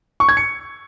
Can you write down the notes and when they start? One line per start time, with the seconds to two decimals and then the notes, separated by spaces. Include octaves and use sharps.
0.20 C#6
0.29 G#6
0.37 C#7